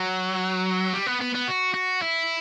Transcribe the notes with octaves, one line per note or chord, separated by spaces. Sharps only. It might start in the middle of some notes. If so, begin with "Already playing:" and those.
Already playing: F#3
G3
B3
B3
B3
F#4
F#4
E4